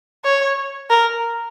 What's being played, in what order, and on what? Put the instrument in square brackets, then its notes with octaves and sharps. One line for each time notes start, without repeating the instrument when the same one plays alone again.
[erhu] C#5
A#4